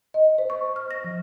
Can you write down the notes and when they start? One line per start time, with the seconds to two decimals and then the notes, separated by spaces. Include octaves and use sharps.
0.14 D#5
0.38 C5
0.50 C#6
0.76 F6
0.91 A#6
1.04 F3